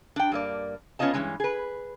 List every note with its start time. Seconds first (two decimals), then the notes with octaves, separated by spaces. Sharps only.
0.16 D4 G5
0.32 G2 A#3 D5
0.99 B3 C#4 E4 F4 D#5 A5
1.14 G2 B2 E3 G#3 C#4
1.40 G#4 B4